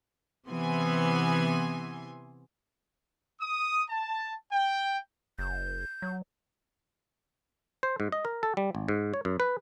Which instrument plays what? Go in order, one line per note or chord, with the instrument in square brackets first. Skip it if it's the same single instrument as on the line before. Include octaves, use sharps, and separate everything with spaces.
[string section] C3 E3 B3 G#5 C6
[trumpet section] D#6
A5
G5
[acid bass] F#1 [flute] G6
[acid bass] F#3
[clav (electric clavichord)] C5
G#2
D#5
A#4
A4
G3
G#1
G#2
C#5
F#2
B4